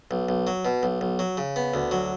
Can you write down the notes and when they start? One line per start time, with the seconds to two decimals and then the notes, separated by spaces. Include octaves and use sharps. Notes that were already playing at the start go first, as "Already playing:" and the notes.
0.11 B1
0.29 B1
0.47 F#3
0.65 B2
0.83 B1
1.01 B1
1.19 F#3
1.37 C#3
1.56 B3
1.74 D2
1.91 F#3